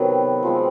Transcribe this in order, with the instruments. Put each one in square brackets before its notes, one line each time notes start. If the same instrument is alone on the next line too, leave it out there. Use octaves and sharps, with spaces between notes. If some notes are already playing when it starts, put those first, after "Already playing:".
Already playing: [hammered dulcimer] C3 D#3 F#3 B3
F3 G#3 C4